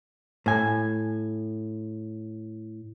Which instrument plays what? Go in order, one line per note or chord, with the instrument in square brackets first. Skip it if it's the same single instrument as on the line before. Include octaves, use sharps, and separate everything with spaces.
[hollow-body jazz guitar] A2 G#5